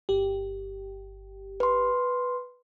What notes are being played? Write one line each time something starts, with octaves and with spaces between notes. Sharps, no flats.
G1 G4
B4 C6